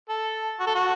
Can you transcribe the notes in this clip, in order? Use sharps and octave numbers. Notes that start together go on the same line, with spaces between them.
A4
F#4
A4
F#4